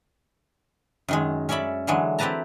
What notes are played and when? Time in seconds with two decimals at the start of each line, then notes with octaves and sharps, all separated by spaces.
1.09 F#2 D#3 G#3
1.49 C#4 C#5 D5 E5 B5
1.87 D3 E3 F#3 G#3
2.19 C4 E4 G4 B4 A5 A#5